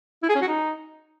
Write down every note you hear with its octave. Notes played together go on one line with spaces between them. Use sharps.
E4
G#4
C#4
F#4
D#4